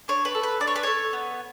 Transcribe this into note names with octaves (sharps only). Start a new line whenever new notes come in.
D4 C#5
B4
A4
B4
D4 D5
C#5
B4
A4 C#5
B3